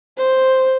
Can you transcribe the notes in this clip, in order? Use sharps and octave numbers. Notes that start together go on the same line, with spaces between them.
C5